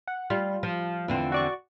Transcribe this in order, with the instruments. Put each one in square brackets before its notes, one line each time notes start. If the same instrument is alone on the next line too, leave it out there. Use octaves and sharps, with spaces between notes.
[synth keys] F#5
[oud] G3 [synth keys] F4
[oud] F3
E2 D3 C4
[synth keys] F#4 D5 C#6